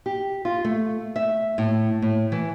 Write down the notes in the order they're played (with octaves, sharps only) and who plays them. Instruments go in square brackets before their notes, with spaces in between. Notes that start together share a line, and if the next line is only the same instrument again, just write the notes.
[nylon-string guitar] G4
F4
A3
E5
A2
A2
E3